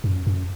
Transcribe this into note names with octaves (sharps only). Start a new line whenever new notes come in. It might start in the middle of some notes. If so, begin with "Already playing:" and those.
F#2
F#2